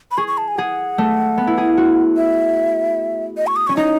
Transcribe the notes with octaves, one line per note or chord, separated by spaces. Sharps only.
B5
G#4 C#6
C#6
A5
G#5
G#4 F#5
A3
B3
E4
G#4
F#4
E5
D#5
C#6
D#6
C#4 C#6
D#4 D#5